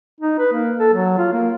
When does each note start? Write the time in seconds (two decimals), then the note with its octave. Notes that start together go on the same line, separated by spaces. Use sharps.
0.21 D#4
0.39 B4
0.53 A#3
0.79 A4
0.94 F#3
1.18 F4
1.33 A#3